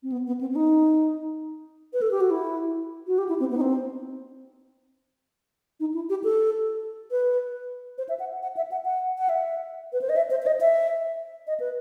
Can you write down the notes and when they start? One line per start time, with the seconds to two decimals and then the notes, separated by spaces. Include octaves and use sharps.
0.03 C4
0.12 B3
0.27 B3
0.41 C4
0.51 C4
0.56 D#4
1.93 B4
2.02 A4
2.11 G4
2.21 F#4
2.31 E4
3.07 F#4
3.18 G4
3.29 E4
3.40 C4
3.51 B3
3.57 D#4
3.61 C4
5.80 D#4
5.94 E4
6.10 G4
6.24 A4
7.11 B4
7.98 C5
8.09 E5
8.19 F#5
8.43 F#5
8.57 E5
8.72 F#5
8.85 F#5
9.18 F#5
9.29 E5
9.93 B4
10.02 C5
10.09 D#5
10.16 E5
10.31 C5
10.42 C5
10.46 D#5
10.61 E5
11.47 D#5
11.60 B4